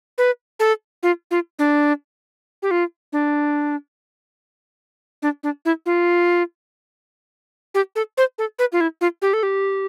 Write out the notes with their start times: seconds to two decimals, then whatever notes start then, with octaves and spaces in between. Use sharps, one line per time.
0.18 B4
0.60 A4
1.03 F4
1.31 F4
1.59 D4
2.62 G4
2.71 F4
3.12 D4
5.22 D4
5.43 D4
5.65 E4
5.86 F4
7.74 G4
7.96 A4
8.17 C5
8.38 A4
8.59 B4
8.72 F4
8.81 E4
9.01 F4
9.22 G4
9.33 A4
9.43 G4